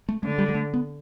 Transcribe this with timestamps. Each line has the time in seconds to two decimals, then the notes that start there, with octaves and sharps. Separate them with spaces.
0.09 A3
0.23 D3 A3
0.38 G3
0.49 G3
0.54 A3
0.74 B3